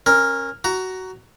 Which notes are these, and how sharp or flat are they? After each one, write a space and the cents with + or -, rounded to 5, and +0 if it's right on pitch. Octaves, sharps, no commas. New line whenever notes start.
C#4 -25 A#4 +0
F#4 +15 A#5 +0